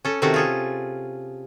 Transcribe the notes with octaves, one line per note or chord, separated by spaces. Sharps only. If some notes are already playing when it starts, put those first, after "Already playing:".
C#4 A4
C3 D#3 A3 C#4 F#4 A4
F4 G#4 A4